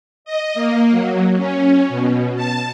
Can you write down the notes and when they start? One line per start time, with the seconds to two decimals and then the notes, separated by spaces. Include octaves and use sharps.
0.25 D#5
0.54 A#3
0.90 F#3
1.37 C#4
1.89 B2
2.36 A5